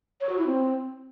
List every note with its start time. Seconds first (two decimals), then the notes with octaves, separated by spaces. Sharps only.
0.21 C#5
0.29 F#4
0.38 E4
0.47 C4